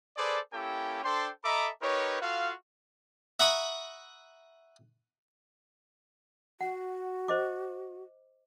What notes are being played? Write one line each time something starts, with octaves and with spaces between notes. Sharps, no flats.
G#4 A4 B4 C5 D5
A#3 C#4 E4 G4 A4 G5
D4 A4 C5 G5 C6
A4 D#5 E5 A#5 B5 D6
D#4 G4 A#4 B4 C#5
F4 F#4 A4 F5
E5 F#5 A#5 B5 C#6 D#6
F#4 F#5
C5 D#5 D6